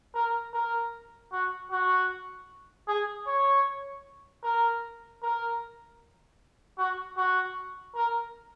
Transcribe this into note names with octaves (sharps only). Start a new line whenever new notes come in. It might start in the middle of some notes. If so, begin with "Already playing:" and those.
A#4
A#4
F#4
F#4
G#4
C#5
A#4
A#4
F#4
F#4
A#4